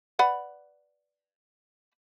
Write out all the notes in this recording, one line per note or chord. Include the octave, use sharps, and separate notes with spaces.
B4 D5 F#5